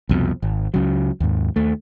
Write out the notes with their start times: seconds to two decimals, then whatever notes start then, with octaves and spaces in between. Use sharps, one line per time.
0.09 C2 F2 B2
0.42 G#1
0.74 C#2 C#3 F#3
1.20 D#2 G#2
1.56 D#2 A3